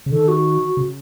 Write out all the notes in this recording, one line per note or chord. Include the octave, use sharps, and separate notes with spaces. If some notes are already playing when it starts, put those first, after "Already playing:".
C#3
D#3 A4
F#4
C#3